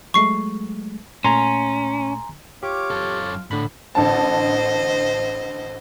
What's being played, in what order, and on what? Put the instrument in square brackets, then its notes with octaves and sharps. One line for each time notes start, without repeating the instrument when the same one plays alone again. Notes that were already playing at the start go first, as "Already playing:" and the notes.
[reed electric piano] F#3 G#3 A3 [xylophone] C#6 C7
[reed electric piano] A#2 A3 [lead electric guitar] C#4 [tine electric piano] G#5 A#5 C6
[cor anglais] F4 [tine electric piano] G4 [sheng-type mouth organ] C#5 D6
[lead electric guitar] F#2 A4
[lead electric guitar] A2 [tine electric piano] D3 B5
[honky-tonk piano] A1 D3 A5 [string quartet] C5 D#5